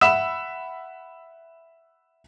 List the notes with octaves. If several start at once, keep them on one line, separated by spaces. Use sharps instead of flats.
E5 F#5 B5 E6 E7